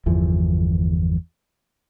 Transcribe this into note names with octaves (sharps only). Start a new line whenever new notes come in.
G1 E2 E3 F3